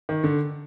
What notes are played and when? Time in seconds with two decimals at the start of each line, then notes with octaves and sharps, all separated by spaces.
0.09 D#3
0.24 D3